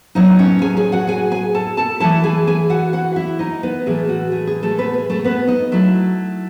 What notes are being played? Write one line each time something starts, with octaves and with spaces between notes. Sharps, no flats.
A2 F#3 B3 D#4 D#5
C#4 C#5
G#4 G#5
G#4 G#5
F#4 F#5
G#4 G#5
G#4 G#5
A4 A5
A4 A5
E3 A3 E4 A4 A5
G#4 G#5
G#4 G#5
F#4 F#5
F#4 F#5
E4 E5
D#4 D#5
B3 B4
A2 E3 A3 G#4
F#4
G#4
G#4
A3 A4
B3 B4
G#4
A3 A4
B3 B4
D#4 D#5
F#3 A3 E4